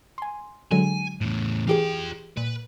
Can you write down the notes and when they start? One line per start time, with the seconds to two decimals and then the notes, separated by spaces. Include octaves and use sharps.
0.18 G#5 C6
0.71 D3 F#3 G#3 G#5
1.21 E2 A2
1.67 E3 F4 G4 G#4 G5
2.37 A#2 B4